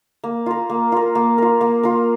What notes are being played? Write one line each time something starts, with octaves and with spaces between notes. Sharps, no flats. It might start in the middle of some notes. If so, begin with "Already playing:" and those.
A#3
F4 A#4
A#3
F4 A#4
A#3
F4 A#4
A#3
F4 A#4